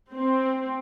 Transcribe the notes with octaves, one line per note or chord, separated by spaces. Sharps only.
C4